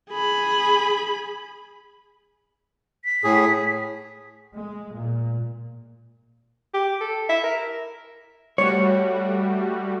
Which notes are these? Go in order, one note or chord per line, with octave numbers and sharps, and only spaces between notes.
G#4 B5
B6
A2 G#4
G#3
A#2
G4
A4
E5
A#4
G3 A3 F#4 C#5